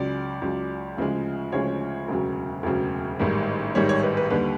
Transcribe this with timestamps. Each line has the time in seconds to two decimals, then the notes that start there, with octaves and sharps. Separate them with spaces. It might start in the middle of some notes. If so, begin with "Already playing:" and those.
Already playing: C#2 C#3 F#3 D5
0.41 C#2 C#3 F#3
0.97 D2 C#3 F3 G#3
1.52 D2 C#3 F3 G#3 C#5
2.08 E1 D2 C#3 F#3
2.63 E1 D2 C#3 F#3
3.19 A1 G#2 D#3 G3
3.75 A1 G#2 D#3 G3 C#5
3.89 C#5
4.03 B4
4.17 B4
4.30 D#2 D3 G3 B4